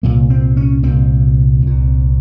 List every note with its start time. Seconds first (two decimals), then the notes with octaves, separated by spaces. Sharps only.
0.03 C2 A#2 A#3
0.30 C4
0.57 C#4
0.83 C2 A#2 C4
1.62 C2 A#2